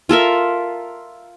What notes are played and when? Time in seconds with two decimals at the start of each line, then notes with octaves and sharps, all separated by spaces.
0.09 F4 A4 A#4 E5